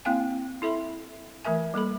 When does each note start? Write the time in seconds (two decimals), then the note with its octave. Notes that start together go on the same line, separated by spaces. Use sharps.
0.05 A#3 C4 E4 F5 G5 G#5
0.62 E4 A4 E5 B5 C6
1.44 E3 A3 A#4 E5 G#5
1.74 G3 A#3 A4 B5